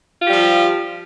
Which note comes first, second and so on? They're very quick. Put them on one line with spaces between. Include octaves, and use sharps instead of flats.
F4 G4 G3 F3